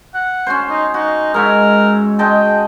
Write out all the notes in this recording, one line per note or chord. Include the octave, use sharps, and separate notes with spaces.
F#5
C#4 F#4 C5
D#4
D#4 F#4
G#2 A#4 C#5 E5
G#3 D#5 G5 A5